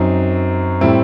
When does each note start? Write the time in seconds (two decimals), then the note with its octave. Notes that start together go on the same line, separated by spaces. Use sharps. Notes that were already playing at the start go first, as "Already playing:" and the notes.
Already playing: F#2 F#3 C4 D#4
0.81 A2 G3 C4 E4